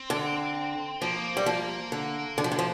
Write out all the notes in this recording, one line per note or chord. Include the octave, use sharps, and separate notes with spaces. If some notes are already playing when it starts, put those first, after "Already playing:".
Already playing: C4
D3
F3 A#3
G3
F3
D3
D3
F3
D3
F3